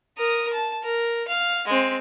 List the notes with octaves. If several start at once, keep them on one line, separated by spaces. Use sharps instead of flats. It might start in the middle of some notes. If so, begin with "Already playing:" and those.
A#4 D#6
A5
A#4
F5
G#3 C4